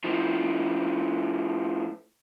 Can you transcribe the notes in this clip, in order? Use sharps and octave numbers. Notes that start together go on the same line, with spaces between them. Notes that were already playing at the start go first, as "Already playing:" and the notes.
A2 F3